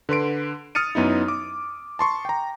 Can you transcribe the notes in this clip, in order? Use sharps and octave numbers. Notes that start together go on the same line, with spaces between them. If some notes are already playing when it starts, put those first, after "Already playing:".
D3 B4 C6 D7
D#6 F6 A6 C#7 D#7
F#2 B3 D#4 E4
D6
A5 C6 C#6
G5 A#5